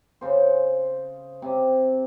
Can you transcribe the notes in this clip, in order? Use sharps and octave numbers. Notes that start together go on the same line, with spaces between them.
C#3 C5
C3